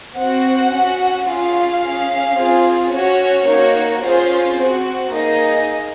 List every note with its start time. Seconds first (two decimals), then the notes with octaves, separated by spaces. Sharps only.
0.18 C4 F#4 F#5
0.73 C#4 F#4
1.28 C#4 F4 G#4 F5
1.83 C#4 G#4
2.38 C4 F4 G#4
2.93 C#4 F#4 C#5
3.47 A#3 D#4 F#4 C#5
4.03 C#4 F4 G#4 C5
4.58 C4 F#4
5.12 A#3 D#4 G#4 D#5